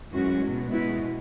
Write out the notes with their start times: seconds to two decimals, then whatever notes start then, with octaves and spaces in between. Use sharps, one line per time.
0.12 F#2 E3 G#3 C#4 F#4
0.42 B2 F#3
0.71 B2 G#3 B3 E4